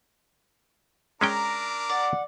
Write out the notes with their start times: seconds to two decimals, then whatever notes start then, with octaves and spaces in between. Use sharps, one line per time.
1.21 G#3 C#4 D4 A#4 G5 A#5 D6
1.90 D5 F#5